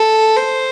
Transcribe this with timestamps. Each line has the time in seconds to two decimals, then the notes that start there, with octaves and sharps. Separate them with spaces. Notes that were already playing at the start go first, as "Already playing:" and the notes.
Already playing: A4
0.37 C5